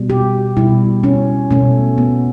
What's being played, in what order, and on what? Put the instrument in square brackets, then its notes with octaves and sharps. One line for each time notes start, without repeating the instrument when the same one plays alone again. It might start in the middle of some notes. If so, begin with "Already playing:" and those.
Already playing: [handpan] B2 G3
G4
B2 G3 E4
C#4
B2 A3 C#4
B3